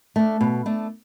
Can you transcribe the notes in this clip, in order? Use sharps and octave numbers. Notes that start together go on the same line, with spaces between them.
A3 D4
B2
A3 D4